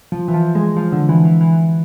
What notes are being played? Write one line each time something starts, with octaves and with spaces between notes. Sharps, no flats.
F3
E3
F3
G#3
F3
D3
E3
E3
E3